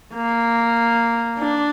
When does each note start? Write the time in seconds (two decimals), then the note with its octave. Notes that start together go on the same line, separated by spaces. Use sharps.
0.15 A#3
1.39 D4